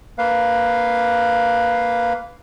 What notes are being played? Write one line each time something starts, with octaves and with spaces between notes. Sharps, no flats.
A#3 B4 F5